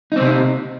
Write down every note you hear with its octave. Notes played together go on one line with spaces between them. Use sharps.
C3 C4 D#4